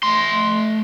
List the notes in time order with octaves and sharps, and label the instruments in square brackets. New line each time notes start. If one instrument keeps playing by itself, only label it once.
[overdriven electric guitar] A3 C6